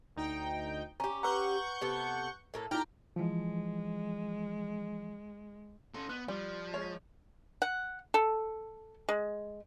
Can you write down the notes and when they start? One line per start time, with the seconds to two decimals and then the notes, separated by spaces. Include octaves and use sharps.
0.16 D2 D#4 G5
1.00 C#4 G4 A#5
1.23 B4 F#5 A#5 C#6 G6
1.81 C3 B3 A4
2.54 A2 A#3 A4
2.71 D#4 E4 G4 G5 A#5 F6
3.16 E3 F3 G#3
5.94 C#4 A4 C6
6.09 B3 F#6
6.28 F3 G3
6.74 G#3 C#5
7.62 F#5
8.14 A4
9.09 G#3